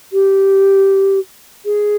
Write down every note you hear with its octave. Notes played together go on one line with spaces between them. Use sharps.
G4
G#4